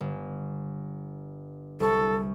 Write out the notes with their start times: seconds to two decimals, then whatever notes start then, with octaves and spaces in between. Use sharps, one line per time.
0.01 G1
1.80 C2 A4 C#6